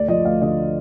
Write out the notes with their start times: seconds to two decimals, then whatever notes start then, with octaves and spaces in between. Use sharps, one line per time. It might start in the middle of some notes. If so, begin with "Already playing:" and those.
Already playing: D2 D5
0.08 F3 D#5
0.25 D2 F5
0.42 D3 D#5